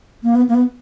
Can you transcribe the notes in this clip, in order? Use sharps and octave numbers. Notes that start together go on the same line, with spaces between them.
A#3
B3
A#3
B3